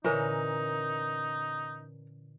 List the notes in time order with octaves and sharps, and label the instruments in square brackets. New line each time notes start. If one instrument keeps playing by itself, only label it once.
[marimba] A#2 D3 [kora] E3 C#4 [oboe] D#4 [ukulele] A#4